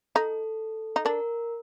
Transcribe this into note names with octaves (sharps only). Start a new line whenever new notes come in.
D#4 A4
D#4
D4 A#4